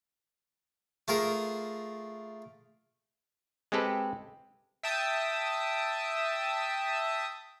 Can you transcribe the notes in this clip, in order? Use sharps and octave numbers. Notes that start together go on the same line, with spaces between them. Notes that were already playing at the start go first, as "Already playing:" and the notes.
A3 F4 G#4 A#4
G#3 C4 G4 A4 B4
E5 G5 A5 D#6 E6